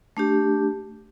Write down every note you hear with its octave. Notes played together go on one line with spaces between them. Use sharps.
A3 D4 G4